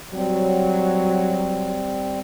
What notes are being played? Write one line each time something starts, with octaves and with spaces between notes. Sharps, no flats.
F#3 G3 C4